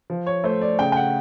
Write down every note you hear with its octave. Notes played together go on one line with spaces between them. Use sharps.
F3
C#5
A3 C5
D5
C#3 G5
G5
F#5